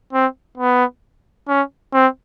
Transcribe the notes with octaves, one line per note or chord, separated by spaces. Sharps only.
C4
B3
C#4
C4